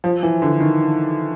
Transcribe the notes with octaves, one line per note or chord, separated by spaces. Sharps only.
F3
E3
D3
D#3